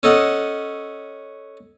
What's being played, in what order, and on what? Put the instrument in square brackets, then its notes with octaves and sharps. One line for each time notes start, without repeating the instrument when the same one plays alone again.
[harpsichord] C#4 A4 D#5 F#5